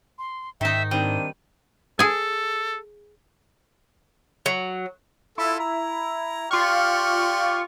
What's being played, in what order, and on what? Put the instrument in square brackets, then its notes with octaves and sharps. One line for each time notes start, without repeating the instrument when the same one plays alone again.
[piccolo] C6
[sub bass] G#2 [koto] D#3 D#4 [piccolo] E5
[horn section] D#3 C4 D4 [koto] G3 [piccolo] D#7
[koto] G#4 G#5 [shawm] A4
[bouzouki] F#3
[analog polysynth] E4 [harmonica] F4 A4
[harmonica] A#5
[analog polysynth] F4 C#6 [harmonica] G4 D5 F6